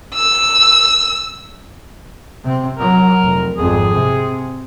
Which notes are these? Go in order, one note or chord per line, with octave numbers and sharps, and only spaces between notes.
E6
C3 C4
F#3 A#4
F1
G#1 F2 G#4
C3